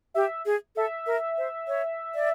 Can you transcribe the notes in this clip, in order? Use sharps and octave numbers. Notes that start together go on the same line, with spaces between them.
G4 E5
G#4
A4 E5
A#4
C5
C#5
D5